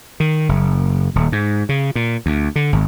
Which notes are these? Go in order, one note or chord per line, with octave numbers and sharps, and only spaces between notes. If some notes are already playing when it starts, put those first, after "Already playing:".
D#3
F#1
D#1
G#2
C#3
A#2
D2
D3
G#1